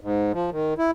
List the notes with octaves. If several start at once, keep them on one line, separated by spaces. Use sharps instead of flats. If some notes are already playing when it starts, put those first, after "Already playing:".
G#2
F3
D#3
E4